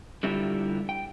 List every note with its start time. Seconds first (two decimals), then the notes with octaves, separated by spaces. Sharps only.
0.23 D3 G3 E4 F4 G4
0.89 G5